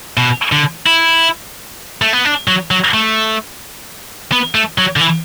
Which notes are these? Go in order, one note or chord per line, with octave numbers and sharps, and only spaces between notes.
B2
D3
E4
A3
B3
D4
F#3
F#3
A3
B3
A3
F#3
D3
E3